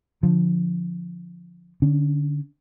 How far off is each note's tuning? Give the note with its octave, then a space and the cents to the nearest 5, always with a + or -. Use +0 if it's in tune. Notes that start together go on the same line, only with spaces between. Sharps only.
D3 +0 F3 +10
D3 +0 C#4 +20